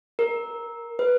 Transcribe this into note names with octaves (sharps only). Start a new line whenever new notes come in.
A#4
B4